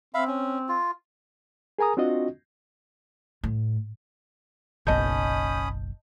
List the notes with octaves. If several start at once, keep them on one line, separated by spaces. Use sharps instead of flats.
C4 E5 F5 B5
C#4
F4
G#4 A#4 G#5 A#5 D#6
C4 D4 F4 F#4 D#5
A2
F#1 B1 C#4 D#5 A5 B5 D#6 G6